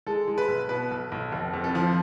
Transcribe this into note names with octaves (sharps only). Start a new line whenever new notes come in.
G#3 A4
G#3
B4
B1
B2 B4
B1
B1
F1
F2
A4
F3